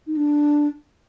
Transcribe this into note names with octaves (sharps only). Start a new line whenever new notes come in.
D#4
D4